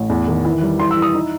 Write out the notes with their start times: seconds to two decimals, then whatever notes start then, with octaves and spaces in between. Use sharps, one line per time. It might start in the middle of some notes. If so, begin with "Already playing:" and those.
Already playing: A1
0.10 E2
0.28 D#3
0.45 E3
0.62 G3
0.79 E3 C6
0.91 E6
0.97 E4
1.02 D#6
1.14 D#4